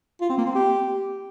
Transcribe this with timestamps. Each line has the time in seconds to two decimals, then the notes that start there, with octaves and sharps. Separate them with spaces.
0.21 F4
0.30 C4
0.38 A#3
0.47 C4
0.55 G4